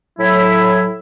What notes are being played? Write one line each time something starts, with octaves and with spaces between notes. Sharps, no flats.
A2 F#3 E4